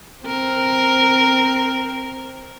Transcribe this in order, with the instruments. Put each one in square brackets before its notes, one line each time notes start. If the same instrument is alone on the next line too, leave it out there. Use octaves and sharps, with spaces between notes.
[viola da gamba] C4 A#4